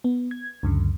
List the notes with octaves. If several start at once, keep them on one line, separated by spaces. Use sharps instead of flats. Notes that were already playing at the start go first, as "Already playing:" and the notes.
B3
G#6
C#2 F#2 D3